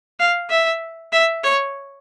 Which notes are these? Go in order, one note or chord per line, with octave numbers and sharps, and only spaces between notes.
F5
E5
E5
C#5